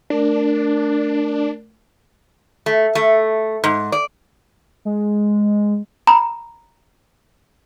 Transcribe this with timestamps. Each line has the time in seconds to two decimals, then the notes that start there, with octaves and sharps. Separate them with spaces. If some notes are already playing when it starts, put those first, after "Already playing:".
0.10 A3 D4 A#4 D5
2.66 A3
2.95 A3
3.64 G#2
3.92 D5
4.85 G#3
6.07 A#5 B5